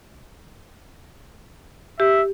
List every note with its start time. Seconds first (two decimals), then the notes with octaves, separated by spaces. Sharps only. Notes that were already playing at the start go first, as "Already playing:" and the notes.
2.00 G4 E5